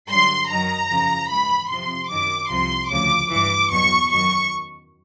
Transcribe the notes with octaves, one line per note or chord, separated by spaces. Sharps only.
G2 D3 F#3 C6
F#2 D#3 F#3 A#5
E2 C#3 F3
G#2 E3 B5
F2 C3 F3 C6
F#2 D#3 F#3 D6
C2 C3 F3 C6
D2 C#3 F3 D6
G2 E3 D6
E2 B2 F#3 C#6
F#2 D#3 F#3 C#6